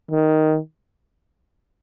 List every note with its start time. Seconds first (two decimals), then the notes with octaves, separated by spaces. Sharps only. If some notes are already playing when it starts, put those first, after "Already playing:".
0.11 D#3